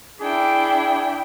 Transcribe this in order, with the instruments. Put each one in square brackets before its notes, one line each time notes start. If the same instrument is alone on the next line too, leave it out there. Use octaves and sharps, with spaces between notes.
[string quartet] D4 E4 G5 [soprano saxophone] G#4